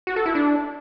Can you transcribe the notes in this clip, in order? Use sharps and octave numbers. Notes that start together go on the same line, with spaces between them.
F#4
A4
E4
D4